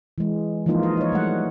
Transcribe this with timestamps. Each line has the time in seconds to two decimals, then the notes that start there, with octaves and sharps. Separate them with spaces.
0.18 E3 G#3
0.66 E3 F3 G#3 A#3 D#4 F4
0.83 D#5
0.97 D#4 C#5
1.12 G3 A3 F#5